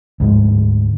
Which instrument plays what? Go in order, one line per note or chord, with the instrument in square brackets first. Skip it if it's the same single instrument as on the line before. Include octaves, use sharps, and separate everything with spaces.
[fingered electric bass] D2 G#2 G#3